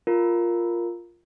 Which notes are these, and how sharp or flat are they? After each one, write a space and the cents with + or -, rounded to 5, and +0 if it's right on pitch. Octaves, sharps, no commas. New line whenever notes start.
F4 +0 A#4 +0